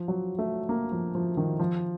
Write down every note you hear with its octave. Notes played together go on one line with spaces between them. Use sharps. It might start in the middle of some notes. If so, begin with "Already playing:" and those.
Already playing: F3
F#3
A3
A#3
F3
F3
D#3
F3